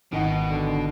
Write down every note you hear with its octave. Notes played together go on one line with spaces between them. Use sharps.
G#1 B2 D#3 D#5 F#5
D3